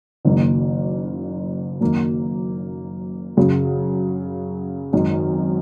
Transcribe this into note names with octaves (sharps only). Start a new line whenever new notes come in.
F#1 F#2 D#3 A#3
F#2 D#3 A#3
F#2 C#3 F#3
G#1 F#2 D#3